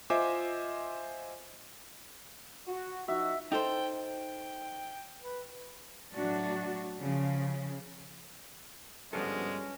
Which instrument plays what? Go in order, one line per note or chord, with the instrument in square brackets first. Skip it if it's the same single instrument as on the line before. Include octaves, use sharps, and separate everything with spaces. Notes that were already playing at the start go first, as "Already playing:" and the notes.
[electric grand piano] F4 C5 D#5 E5 G#5 D6
[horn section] F#4
[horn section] F3 D#4 F#4 [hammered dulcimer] E5
[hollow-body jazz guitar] D#4 A4 C5 [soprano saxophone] G5
[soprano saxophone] G5
B4
[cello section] A2 F#3 D4 F#4
C#3 F3
[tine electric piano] G2 F3 B3 [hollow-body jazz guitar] G3 F4 A4 [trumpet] G#3 [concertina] C#4